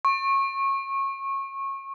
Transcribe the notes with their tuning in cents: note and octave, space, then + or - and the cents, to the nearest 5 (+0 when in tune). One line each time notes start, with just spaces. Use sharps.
C#6 -25